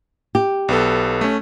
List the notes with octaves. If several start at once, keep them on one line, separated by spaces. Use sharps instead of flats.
G4
B1 B3 A4
A3 C#4